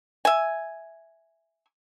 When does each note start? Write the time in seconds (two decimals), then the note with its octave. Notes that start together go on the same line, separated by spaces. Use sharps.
0.25 E5 G#5